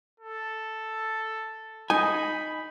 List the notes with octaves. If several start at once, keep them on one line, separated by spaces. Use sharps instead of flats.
A4
D#4 G#5 B5